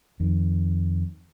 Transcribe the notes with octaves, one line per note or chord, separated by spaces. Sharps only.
F2 D#3